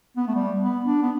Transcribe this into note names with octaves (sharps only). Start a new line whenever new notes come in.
B3
A3
G3
B3
D4
B3